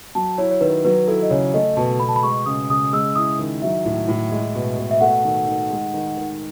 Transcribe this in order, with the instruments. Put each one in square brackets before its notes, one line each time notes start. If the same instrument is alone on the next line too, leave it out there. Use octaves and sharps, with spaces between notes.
[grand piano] F#3 [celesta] A5
[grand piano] E4 [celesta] C#5
[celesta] C#5
[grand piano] D#3 [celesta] B4
[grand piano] F#3 [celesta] B4
[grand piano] E4 [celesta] A4
[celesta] D#5
[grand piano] C#3 [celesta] C#5
[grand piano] A3 [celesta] D#5
[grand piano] B2 [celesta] A5
[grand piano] B2 [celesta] B5
[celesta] A5
B5
[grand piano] G#3 [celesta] C#6
[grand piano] C#3 [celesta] D#6
[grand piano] C#3 [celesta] D#6
[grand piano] G#3 [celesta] E6
[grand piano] E4 [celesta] D#6
[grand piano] D#3
[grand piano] F#3 [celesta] E5
[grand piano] A2
A2
G#3
B2
B2
[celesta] E5
[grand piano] A3 [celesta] F#5
[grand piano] D#3
D#3
G#3
D#3
D#3